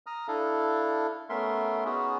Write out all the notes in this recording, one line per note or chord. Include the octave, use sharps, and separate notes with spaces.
A#5 D#6 F6
D4 E4 A4 F5
A3 B3 C#4 A#4 E5 C6
B3 C#4 D#4 F#4 G#4